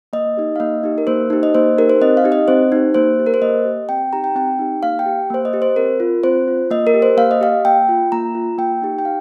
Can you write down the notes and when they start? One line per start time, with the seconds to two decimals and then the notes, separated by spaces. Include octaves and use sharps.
0.13 A#3 D#5
0.37 D#4 G4
0.56 F5
0.60 A#3 D#5
0.83 D#4 G4
0.98 A#4
1.07 A#3 C5
1.30 D#4 G4
1.43 D#5
1.55 A#3 C5
1.78 D#4 G4 A#4
1.89 C5
2.01 C4 D#5
2.17 F5
2.24 D#4 G4
2.32 D#5
2.48 C4 C5
2.72 D#4 G4
2.94 A#3 C5
3.19 G4
3.26 A#4
3.34 C5
3.42 A#3 D#5
3.65 G4
3.89 C4 G5
4.13 D#4 G4 A#5
4.24 G5
4.35 C4 G5
4.59 D#4 G4
4.83 A#3 F5
4.99 G5
5.06 G4
5.30 A#3 C5
5.45 D#5
5.53 G4
5.62 C5
5.76 C4 A#4
6.00 F4
6.23 C4 C5
6.48 F4
6.71 A#3 D#5
6.87 A#4
6.94 G4
7.02 C5
7.17 A#3 F5
7.31 D#5
7.41 G4 F5
7.65 A#3 G5
7.89 F4
8.12 A#3 A#5
8.35 F4
8.58 A#3 G5
8.82 D#4 G4
8.99 G5
9.05 F5